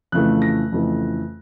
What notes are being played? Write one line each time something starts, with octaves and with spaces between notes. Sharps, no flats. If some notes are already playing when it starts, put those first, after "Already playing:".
F2 C#3 E3 A3 F#6
A#6
F2 C#3 E3 A3